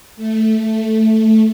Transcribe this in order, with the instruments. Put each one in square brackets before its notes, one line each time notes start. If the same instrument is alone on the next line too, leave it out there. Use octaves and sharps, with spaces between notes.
[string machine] A3